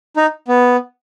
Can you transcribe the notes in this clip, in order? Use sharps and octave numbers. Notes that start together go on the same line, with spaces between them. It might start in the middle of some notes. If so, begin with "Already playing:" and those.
D#4
B3